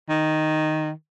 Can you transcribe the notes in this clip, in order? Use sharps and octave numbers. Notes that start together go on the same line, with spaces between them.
D#3